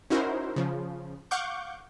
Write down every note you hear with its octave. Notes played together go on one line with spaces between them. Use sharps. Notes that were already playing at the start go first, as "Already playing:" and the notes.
C#4 D#4 E4 F#4 A#4 C5
C#3 F3
F5 F#5 C#6 D6 G6